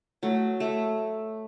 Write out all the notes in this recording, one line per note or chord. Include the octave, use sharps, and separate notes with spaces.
F#3 A3
A3